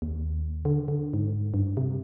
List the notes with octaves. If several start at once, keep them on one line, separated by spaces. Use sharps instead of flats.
D#2
D3
D3
G#2
G2
C3